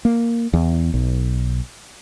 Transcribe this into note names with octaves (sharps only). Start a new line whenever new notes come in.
A#3
E2
B1